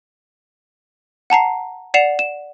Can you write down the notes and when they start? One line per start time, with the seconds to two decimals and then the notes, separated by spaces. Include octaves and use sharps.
1.30 F#5 A5 A#5 C7
1.94 D5 F#5 C7 E7 F7
2.19 E7